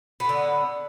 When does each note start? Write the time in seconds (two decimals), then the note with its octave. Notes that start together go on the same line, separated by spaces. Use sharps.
0.20 B3
0.25 A2
0.29 D3